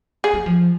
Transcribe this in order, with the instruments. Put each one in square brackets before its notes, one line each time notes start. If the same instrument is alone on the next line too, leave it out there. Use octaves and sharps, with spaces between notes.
[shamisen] G#4
[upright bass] F#3
F3